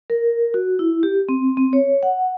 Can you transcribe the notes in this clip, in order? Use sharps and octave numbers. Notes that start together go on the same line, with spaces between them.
A#4
F#4
E4
G4
C4
C4
C#5
F#5